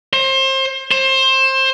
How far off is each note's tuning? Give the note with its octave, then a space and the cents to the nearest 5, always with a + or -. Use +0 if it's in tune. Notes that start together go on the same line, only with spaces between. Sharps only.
C5 +30
C5 +25